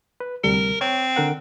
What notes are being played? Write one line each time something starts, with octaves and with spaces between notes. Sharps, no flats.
B4
D2 C3 G3 A#4
C4 C#5
D3 A#4 F#5